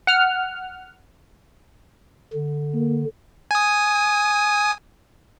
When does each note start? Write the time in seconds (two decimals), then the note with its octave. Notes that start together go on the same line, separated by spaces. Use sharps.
0.07 F#5 F6
2.33 D3
2.74 A#3
3.51 G#5 D#6